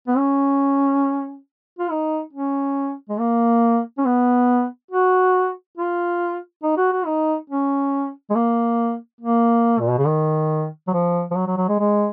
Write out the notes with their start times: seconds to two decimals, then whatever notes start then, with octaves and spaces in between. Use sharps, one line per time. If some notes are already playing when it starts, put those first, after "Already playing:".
0.08 B3
0.18 C#4
1.79 F4
1.90 D#4
2.33 C#4
3.09 G#3
3.19 A#3
3.98 C#4
4.05 B3
4.91 F#4
5.77 F4
6.63 D#4
6.77 F#4
6.92 F#4
7.06 D#4
7.50 C#4
8.30 G#3
8.35 A#3
9.21 A#3
9.80 A#2
9.89 B2
9.98 C#3
10.07 D#3
10.88 F#3
10.93 F3
11.31 F3
11.36 F#3
11.47 F#3
11.57 F#3
11.69 G#3
11.79 G#3